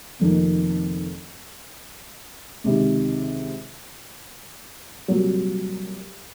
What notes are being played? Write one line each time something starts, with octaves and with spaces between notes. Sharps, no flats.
F1 F2 D#3 A#3
C#2 C3 D#3
C2 A#2 F#3